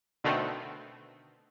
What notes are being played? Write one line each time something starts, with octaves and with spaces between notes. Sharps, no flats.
B2 D3 D#3 A3 B3 C4